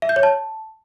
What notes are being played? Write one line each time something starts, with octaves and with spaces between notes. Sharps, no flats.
E5
G6
C#5
A5